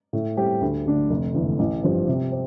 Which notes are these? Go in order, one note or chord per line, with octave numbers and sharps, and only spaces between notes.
A2
G3 C4 G4
D2
D3 A3 D4
F1
E2 D3 A3
A1
G2 F3 C4 G4
C3
C4